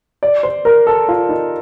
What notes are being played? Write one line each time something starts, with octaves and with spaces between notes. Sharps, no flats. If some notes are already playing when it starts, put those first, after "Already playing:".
D5
C5
A#4
A4
F4
D#4